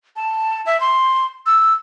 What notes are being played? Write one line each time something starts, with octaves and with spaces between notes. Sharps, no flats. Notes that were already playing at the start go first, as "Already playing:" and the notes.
A5
E5
C6
E6